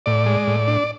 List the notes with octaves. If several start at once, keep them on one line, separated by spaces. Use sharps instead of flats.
A2 D5
G#3
A2
D4